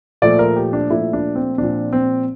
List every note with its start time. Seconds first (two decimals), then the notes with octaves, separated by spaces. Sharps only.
0.22 A#2 F3 A3 D5
0.39 A#4
0.56 G4
0.73 D4
0.90 A#2 F3 A3 E4
1.13 D4
1.35 C4
1.58 A#2 F3 C4 D4
1.93 C4